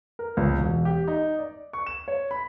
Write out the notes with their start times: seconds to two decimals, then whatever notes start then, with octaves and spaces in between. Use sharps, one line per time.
0.19 A#4
0.37 C#2
0.59 E1
0.85 G4
1.08 D#4
1.39 D5
1.73 C#6
1.86 E7
2.08 C#5
2.31 B5